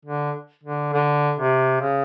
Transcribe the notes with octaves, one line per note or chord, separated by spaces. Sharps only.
D3
D3
D3
C3
C#3